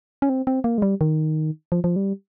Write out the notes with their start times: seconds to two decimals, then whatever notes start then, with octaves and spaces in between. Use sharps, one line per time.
0.22 C#4
0.29 C4
0.47 C4
0.64 A#3
0.78 G#3
0.82 G3
1.01 D#3
1.72 F3
1.84 F3
1.96 G3